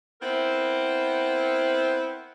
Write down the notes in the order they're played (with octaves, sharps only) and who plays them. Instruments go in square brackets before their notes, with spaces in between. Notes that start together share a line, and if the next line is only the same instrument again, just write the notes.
[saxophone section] B3 C4 E4 A#4